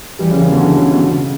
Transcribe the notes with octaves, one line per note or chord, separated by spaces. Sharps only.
E3 G3
C#3 E3
C#3 E3
B2 D3
C#3 E3
C#3
B2
C#3